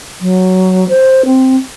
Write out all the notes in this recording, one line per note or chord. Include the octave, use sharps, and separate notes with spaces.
F#3
C5
C4